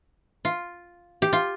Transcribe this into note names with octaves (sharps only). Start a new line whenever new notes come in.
F4
G4
F4